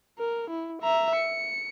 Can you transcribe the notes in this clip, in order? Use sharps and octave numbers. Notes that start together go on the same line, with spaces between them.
A#4
E4
E5 A#5
C#7